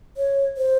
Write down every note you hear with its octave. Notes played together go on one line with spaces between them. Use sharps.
C#5
C5